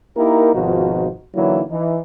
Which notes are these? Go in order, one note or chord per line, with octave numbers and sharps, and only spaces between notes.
A#3 D#4 E4 G4 A#4
G#1 B2 F3 D#4 F4 F#4
D3 E3 F#3 A#3 D#4 E4
E3 D#4